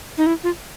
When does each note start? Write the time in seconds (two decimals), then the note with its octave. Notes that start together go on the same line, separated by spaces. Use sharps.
0.18 D#4
0.26 E4
0.44 F4